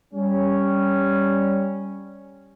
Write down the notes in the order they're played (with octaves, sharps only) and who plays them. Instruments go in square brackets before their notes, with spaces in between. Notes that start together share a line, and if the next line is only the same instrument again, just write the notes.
[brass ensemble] G3 C#4